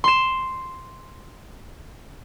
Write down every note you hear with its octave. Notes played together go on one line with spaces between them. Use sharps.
C6 E7